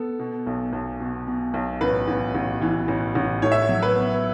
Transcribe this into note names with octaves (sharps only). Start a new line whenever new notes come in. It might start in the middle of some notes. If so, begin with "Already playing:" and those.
Already playing: B3 A4
B2
B1
B1
B2
B2
B1
A1 B4
A1
A1
E3
A1
A1
A2 C#5
E5
C#5
F#3
B4
B3